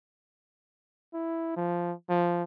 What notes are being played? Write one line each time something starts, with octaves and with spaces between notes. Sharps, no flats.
E4
F3
F3